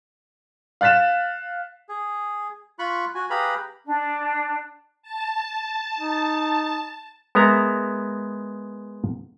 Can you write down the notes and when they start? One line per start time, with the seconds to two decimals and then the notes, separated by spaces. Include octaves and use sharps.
0.81 F5 F#6 A6 B6 E7
1.89 G#4
2.79 F4 B5 C#6 F#6
3.15 F#4 G#5
3.30 G4 G#4 B4 F5 A#5 B5
3.85 D4
5.03 A5
5.98 D#4
7.35 G#3 B3 A#4 E5 A#5